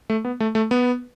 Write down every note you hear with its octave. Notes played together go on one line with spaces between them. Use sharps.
A3
B3
A3
A3
B3